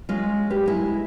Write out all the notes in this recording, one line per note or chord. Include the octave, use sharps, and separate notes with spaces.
G#3 C#4 F4
G4 B4
G#3 E4